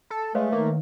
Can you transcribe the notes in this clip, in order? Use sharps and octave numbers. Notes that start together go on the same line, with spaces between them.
A4
G#3 A3 B4 C#5 F5
D#3 A#3